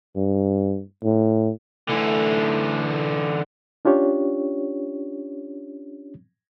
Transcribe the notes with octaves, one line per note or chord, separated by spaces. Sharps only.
G2
A2
D3 E3 A3
C#4 D4 F4 G4 C#5